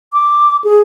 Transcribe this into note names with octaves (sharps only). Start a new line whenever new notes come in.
D6
G#4